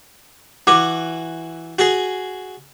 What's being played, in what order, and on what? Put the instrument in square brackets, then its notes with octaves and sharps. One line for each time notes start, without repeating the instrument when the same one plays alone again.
[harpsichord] E3 F#4 [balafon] D6
[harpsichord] F#4 G#4